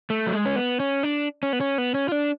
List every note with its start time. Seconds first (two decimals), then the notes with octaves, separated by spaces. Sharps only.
0.10 A3
0.27 F#3
0.33 G#3
0.46 C#4
0.56 B3
0.80 C#4
1.03 D4
1.43 C#4
1.53 B3
1.61 C#4
1.78 B3
1.94 C#4
2.09 F4
2.12 D4